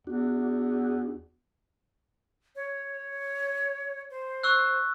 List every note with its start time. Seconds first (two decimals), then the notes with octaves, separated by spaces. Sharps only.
0.07 E2 D4 F#4
2.56 C#5
4.10 C5
4.43 C#6 E6 F#6